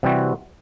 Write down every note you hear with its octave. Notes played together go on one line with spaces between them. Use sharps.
C3 E3 G3 C4 F#4